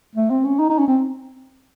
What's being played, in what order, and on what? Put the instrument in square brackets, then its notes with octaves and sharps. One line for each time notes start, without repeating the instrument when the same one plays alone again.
[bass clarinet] A3
C4
C#4
D#4
D#4
C#4
C4